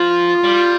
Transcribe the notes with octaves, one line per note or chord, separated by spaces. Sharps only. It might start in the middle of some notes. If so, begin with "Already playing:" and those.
Already playing: F3 F4
G3